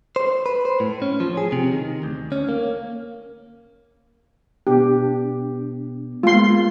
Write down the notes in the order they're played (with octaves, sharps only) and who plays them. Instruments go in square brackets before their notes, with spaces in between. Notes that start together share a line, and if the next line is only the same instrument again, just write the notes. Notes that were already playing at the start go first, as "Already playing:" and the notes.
[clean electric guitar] C5
B4
C5
A2
C#4
F3
G#4
C3
D#3
D2
C#4
A#3
[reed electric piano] B2 B3 D4 [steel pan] G4
[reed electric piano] G#3 A#3 B3 [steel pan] F4 C6